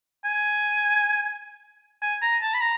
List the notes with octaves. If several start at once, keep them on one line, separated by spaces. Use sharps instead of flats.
G#5
G#5
A#5
A5
B5
A#5